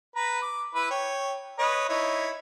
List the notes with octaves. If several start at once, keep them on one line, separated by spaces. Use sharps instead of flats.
B4 A#5
D6
E4 B4
C#5 G5
B4 C#5 D#5
D#4 E4 C#5